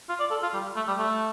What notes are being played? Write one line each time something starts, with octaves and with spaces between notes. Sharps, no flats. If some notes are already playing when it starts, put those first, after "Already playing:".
F4
D5
A4
F4
G3
A3
G3
A3